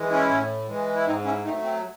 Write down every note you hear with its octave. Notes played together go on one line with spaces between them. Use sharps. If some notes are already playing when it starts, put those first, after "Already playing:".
Already playing: E3 G#3
C#4 E4
A2
E3 G#3
E4
G#2 C4 D#4
C#4 E4
F#3 A3 C4 D#4
C4